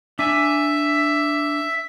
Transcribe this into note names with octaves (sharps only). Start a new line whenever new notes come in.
D4 E5 G#5